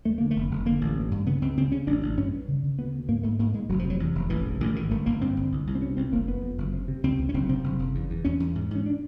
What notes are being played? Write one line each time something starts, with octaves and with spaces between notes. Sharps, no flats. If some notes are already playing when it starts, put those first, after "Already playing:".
D#2 A3
D3 A#3
A3
F1
F1
D3 A#3
A1
G2
G2
C#3 B3
C#2 C4
C#3 C4
C#3 C#4
A1 D4
A1
G2 C#4
G2
C#3
C#3
D2 B3
D2
G#2 A#3
G#2 A3
G#2 A#3
G#2 G#3
F1 F#3
F3
C3
F#3
E2
F1
A1 E3
G#2
A1 D#3
G#2 D#3
G1 A3
G1 A#3
G2 C4
G1
C2
C2
C4
B2 C#4
C2 C4
F#1 A#3
F#1 B3
F2
F#1
C3
C3
C#2 C4
C#2
C#4
F#1 C4
C3 C4
F#1
F#1
E2
E2
E2 C#4
E2
G#2
G#2 C#4
D4